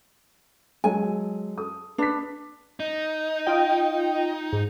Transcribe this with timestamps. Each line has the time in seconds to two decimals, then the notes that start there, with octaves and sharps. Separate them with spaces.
0.84 F#3 G#3 A4 G#5
1.58 A4 D#6
1.98 D4 B4 B6
2.80 D#4
3.47 F4 D#5 G5
4.53 G#2